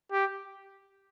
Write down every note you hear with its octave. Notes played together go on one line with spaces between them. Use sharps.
G4